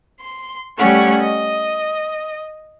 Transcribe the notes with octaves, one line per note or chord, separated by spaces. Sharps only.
C6
G3 A3 C#4 C#5 F#5
D#5